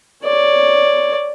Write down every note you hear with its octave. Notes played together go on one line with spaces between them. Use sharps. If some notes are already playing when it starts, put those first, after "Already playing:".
C#5 D5